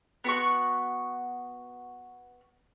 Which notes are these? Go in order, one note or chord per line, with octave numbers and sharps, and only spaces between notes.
B3 F#4 C#6